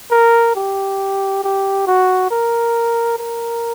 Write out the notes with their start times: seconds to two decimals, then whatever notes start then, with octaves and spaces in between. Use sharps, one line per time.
0.11 A#4
0.56 G4
1.44 G4
1.87 F#4
2.31 A#4
3.19 A#4